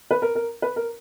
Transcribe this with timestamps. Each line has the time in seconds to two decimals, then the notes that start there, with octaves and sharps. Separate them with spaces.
0.11 B4
0.22 A#4
0.35 A#4
0.62 B4
0.76 A#4